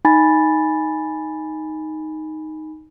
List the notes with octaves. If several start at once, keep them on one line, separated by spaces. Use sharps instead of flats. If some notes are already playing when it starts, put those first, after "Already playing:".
D#4 G#5 B5 A6